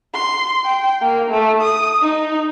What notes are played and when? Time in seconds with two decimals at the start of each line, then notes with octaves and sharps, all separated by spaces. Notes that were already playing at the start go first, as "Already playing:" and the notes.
0.14 C6
0.65 G5
1.02 A#3
1.30 A3
1.61 D#6
2.02 D#4